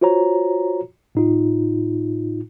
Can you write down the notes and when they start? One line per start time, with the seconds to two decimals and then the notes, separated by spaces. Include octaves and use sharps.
0.01 F4 F#4 C5 C#5 A#5
1.15 A2 D#4 F4